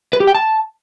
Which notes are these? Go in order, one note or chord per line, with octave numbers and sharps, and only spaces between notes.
B4
G4
G5
A5